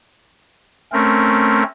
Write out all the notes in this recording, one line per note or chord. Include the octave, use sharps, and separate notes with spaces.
A3 C4 C#4 A#4